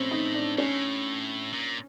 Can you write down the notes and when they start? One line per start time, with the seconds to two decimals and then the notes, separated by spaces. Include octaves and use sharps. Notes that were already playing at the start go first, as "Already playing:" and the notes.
Already playing: A2 C4 C#4
0.11 D#4
0.34 D4
0.58 A2 C#4
1.53 A#2